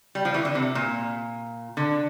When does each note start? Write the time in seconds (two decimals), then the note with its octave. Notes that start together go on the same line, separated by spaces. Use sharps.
0.15 G3
0.25 F3
0.34 E3
0.45 D3
0.55 C3
0.75 A#2
1.77 D3